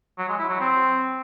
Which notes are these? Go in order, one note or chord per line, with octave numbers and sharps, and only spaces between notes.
F#3
G#3
E4
F#3
C4